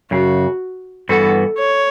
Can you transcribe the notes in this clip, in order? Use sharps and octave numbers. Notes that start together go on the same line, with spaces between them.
F#2 C#3 F#4
G2 E3 B3 F#4 A4
C#5